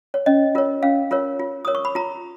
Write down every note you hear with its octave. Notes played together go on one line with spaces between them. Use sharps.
C#5
C#4 D#5
F4 A#4 C#5
C#4 F5
F4 A#4 C#5
F4
A#4 C#5 D#6
C#6
B5
F4 A#5